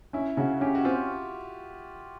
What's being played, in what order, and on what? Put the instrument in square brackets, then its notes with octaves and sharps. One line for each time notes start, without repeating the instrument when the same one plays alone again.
[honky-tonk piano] C#4 [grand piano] E4
[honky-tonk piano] C#3 [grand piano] F#4
[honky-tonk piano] C#4 [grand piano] G4
[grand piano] F#4
[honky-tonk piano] C4 [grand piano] F4